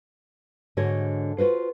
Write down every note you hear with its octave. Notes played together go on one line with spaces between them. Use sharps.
G#2 D3 F#4 C#5 D#5
F4 F#4 B4 C5